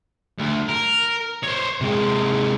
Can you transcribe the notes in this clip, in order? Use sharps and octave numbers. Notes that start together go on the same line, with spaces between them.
D2
A#4
C5 C#5
C3 G#3